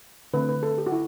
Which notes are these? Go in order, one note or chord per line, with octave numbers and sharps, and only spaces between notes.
D3 A3 C4 B4
B4
A4
G4
F#4
E4